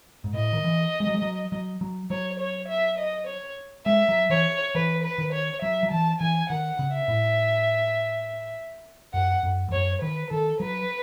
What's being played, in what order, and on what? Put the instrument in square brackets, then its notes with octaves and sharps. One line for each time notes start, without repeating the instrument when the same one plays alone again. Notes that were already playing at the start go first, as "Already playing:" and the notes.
[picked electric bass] G#2
[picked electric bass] A2 [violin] D#5
[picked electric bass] D#3
E3
G#3
F#3
G#3
F#3
F#3
F#3
[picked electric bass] F#3 [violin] C#5
[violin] C#5
E5
D#5
C#5
[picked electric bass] G#3 [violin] E5
[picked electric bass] F#3
[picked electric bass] E3 [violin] C#5
[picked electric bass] E3 [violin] B4
[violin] B4
[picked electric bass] D#3
[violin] C#5
[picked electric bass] F#3 [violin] E5
[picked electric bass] F#3
[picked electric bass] E3 [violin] A5
[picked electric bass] E3 [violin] G#5
[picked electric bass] D#3 [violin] F#5
[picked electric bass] C#3
[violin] E5
[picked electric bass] A2
[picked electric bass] F#2 [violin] F#5
[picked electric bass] F#2
E2
[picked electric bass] F#2 [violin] C#5
[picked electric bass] D#3 [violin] B4
[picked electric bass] D#3 [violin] A4
[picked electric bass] F#3 [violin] B4